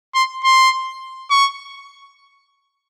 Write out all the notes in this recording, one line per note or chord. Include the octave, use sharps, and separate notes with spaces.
C6
C6
C#6